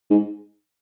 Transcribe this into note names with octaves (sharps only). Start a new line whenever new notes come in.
G#2